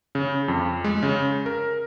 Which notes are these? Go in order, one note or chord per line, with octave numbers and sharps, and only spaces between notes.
C#3
F2
G#3
C#3
A#4